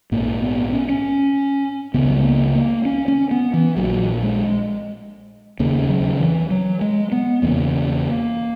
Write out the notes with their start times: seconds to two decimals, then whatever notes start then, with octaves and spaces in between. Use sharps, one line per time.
0.12 A#1 G#2 A#3
0.42 B3
0.73 C#4
0.89 C#4
1.94 C#2 C#3 B3
2.08 F#3
2.16 G#3
2.24 A#3
2.56 A#3
2.85 C#4
3.08 C#4
3.31 B3
3.54 E3
3.77 A#1 A#2 F#3
4.23 G#3
5.60 E1 D#2 C#3 A#3
5.89 F#3
6.20 E3
6.51 F#3
6.81 G#3
7.12 B3
7.42 E1 E2 C#3 A#3